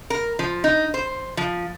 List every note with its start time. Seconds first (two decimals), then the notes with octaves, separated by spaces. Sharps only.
0.10 A#4
0.39 F3
0.64 D#4
0.94 C5
1.37 F3